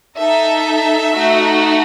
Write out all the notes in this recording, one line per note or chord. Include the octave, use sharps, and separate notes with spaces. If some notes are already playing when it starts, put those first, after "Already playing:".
D#4 A4 E5
A3 D#4 F#4